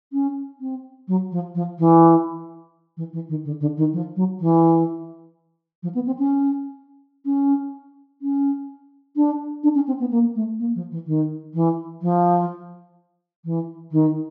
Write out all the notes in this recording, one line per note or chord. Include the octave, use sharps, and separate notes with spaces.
C#4
C4
F#3
F3
F3
E3
E3
E3
D#3
D3
D3
D#3
F3
F#3
E3
F3
B3
C4
C#4
C#4
C#4
D4
D4
C#4
C4
B3
A#3
A3
A#3
F3
E3
D#3
E3
F3
E3
D#3